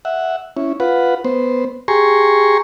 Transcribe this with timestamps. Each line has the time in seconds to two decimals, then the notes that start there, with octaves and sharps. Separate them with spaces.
0.05 E5 F#5
0.57 C#4 E4
0.80 F4 B4 F#5
1.24 B3 C5
1.88 G4 G#4 G#5 A#5 C6 C#6